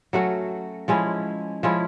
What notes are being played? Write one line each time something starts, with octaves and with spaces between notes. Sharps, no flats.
F#3 A3 C#4 F#4
F3 G#3 C#4 E4
F3 G#3 C#4 E4